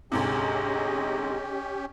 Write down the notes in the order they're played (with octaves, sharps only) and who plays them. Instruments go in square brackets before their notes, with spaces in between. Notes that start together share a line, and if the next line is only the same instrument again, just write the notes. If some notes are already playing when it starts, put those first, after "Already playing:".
[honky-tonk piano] D2 G#2 C3 [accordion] C#4 G4 [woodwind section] G#4 D#5